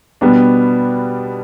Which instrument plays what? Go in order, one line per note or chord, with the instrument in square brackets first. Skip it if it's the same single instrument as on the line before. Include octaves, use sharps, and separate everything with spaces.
[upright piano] B2 G3 D4 [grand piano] B3